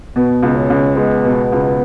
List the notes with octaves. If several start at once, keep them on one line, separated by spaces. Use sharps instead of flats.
B2 B3
C#2
C#4
C#2
G#3 B3
B2
C#2